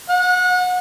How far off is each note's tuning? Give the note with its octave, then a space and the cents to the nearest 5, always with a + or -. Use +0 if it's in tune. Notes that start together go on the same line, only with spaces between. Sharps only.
F#5 -30